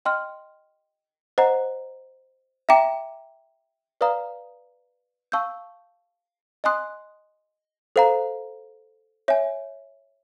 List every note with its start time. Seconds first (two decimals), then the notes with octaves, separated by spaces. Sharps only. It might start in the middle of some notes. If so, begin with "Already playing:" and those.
0.05 D#5 G5 C6 F6
1.38 C5 D#5 F#5 A#5
2.69 E5 G5 A#5 D6
4.01 B4 D5 F5 A#5 D#6
5.32 F5 A5 C#6 E6 G6
6.64 D#5 G#5 C6 D#6 F#6
7.96 A4 C5 F5 A#5
9.28 C#5 E5 G#5